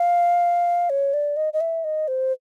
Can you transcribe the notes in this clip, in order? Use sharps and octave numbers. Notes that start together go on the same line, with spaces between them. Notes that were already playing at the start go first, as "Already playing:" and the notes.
Already playing: F5
C#5
D5
D#5
D#5
E5
D#5
C5